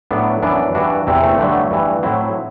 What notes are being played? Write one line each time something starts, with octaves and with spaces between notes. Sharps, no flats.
A2 F#3 B3 D4
F#2 E3 B3 D4
G2 E3 D4 F#4
E2 C3 E3 C4 E4
A3 C4
G2 D3 F#3 A3
G2 E3
A2 F#3 C4 E4